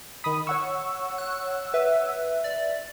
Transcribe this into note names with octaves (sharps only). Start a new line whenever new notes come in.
D#3 B5 D#6
C#5 F#5 C#6 E6
F#6
B4 E5
D5